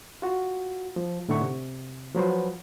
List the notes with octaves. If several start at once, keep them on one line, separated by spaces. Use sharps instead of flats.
F4 F#4
F3
A2 D3 E4 F#5 C#6
C3
F3 F#3 B4 C5